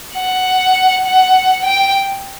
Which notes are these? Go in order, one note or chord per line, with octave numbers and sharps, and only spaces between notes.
F#5
F#5
G5